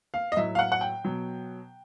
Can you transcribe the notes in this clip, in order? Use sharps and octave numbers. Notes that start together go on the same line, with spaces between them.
F5
D#5
A2 F#3 E5
F5
F#5
F#5
G5
B2 F#3